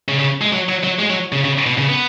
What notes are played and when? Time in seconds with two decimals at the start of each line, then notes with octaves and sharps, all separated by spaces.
0.09 C#3
0.19 C#3
0.41 G#3
0.53 F#3
0.69 F#3
0.84 F#3
0.99 G#3
1.10 F#3
1.32 C#3
1.45 C#3
1.66 B2
1.78 C#3
1.89 B3